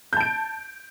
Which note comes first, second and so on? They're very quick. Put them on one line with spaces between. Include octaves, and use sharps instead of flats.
G6 A5 D7